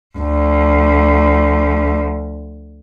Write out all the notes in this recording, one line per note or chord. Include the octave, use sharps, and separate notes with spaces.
D2 F3